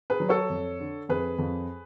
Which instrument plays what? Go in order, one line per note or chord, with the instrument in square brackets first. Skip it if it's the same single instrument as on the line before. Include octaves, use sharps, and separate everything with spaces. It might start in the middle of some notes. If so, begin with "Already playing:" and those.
[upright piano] G#4 B4
F#3
A4 C#5
F2
D3
F2 G#4 B4
F2